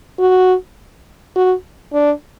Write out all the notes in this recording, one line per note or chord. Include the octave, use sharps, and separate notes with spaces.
F#4
F#4
D4